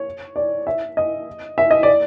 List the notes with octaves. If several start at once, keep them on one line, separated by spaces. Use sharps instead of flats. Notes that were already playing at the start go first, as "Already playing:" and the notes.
Already playing: C#5
D5
E5
D#5
E5
D#5
D5